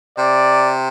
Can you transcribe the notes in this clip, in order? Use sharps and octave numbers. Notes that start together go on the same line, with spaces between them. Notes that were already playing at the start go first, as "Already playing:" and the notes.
C3 D5